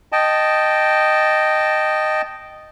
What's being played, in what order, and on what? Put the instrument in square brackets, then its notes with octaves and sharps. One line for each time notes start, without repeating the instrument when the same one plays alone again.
[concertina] D#5 G5 A5